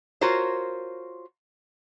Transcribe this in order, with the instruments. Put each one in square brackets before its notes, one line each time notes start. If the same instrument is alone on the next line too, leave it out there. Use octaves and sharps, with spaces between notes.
[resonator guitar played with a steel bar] F4 F#4 A#4 C5 C#5